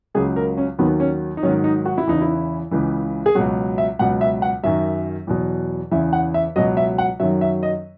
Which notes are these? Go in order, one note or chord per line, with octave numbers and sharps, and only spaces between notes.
C#2 C#3 F#3 G#4
A#4
C#4
D#2 D#3 F#3 B3
C#4
D#4
G#2 D#3 F#3 C#4
D#4
F#4
E4
E2 C#3 E3 D#4
E4
C#2 C#3 E3
G#4
C#2 B2 F#3 F#4
E5
C#2 B2 F#3 F#5
E5
F#5
F#2 D#3 F#3 E5
E2 B2 F#3
E2 C#3 E3 E5
F#5
E5
C#2 B2 F#3 D#5
E5
F#5
F#2 D#3 F#3 E5
E5
D#5